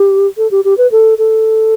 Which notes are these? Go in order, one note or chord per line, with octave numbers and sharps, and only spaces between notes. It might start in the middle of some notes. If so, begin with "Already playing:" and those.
Already playing: G4
A4
G4
G4
B4
A4
A4